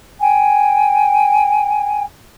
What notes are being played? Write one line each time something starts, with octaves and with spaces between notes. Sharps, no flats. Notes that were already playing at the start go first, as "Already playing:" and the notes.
G5 G#5